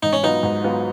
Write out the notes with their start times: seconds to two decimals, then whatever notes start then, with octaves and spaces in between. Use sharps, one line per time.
0.02 G#2 D#4
0.13 C#4
0.23 F#3 B3 D#4 F4
0.43 G#2
0.64 F#3 B3 F4